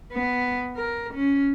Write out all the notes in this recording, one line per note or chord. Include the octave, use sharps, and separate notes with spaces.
B3
A#4
C#4